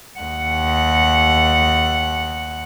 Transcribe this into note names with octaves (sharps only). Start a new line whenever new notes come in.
D#2 F#5